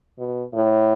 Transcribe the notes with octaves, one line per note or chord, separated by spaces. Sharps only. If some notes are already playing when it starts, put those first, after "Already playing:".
B2
A2